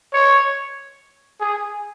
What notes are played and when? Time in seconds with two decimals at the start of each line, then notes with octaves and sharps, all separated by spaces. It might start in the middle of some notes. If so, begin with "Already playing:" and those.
0.13 C#5
1.40 G#4